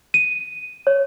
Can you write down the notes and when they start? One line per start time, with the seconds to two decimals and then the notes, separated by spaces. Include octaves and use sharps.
0.14 D#7
0.87 C#5